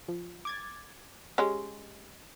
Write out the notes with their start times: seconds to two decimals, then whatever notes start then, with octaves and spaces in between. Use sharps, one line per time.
0.08 F3
0.45 D6 G#6 A6
1.38 G#3 C#4 G4